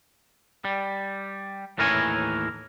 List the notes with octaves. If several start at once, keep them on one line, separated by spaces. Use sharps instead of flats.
G3
D#2 A2 E3 A#4 C#5 G#5